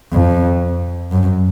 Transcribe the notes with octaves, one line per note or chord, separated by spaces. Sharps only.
F2
F#2